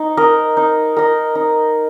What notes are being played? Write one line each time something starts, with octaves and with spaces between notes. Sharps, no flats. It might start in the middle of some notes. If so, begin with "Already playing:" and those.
Already playing: D#4
A#4 D#5
D#4
A#4 D#5
D#4